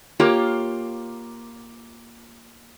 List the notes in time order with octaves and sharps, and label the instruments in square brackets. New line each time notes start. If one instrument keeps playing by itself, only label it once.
[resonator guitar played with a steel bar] A#3 F4 G4 C#5